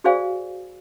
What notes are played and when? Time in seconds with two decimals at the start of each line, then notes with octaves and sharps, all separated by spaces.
0.04 F#4 G#4 C5 D5 F5 G#5